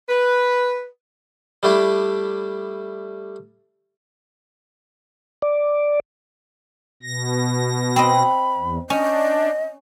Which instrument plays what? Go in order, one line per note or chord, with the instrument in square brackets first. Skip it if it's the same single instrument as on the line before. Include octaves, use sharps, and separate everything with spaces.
[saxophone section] B4
[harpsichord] G3 A3 D4 E4
[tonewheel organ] D5
[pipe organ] B2 A#6
[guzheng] C4 D#5 [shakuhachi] B5
[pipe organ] E2
[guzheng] C#4 [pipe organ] D4 [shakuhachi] D#5